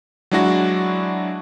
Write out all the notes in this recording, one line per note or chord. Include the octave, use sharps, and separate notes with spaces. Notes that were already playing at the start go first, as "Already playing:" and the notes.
F#3 G#3 D4 E4 F#4 A#6